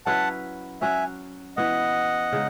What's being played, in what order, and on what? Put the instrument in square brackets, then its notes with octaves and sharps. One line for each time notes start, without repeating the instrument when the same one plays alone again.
[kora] F#3 C#4 E4 B4 [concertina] F#5 A5
[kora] F#3 C#4 F#4 [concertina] E5 G#5
[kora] E3 B3 F#4 [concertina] D#5 F#5
[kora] C#3 G#3 D#4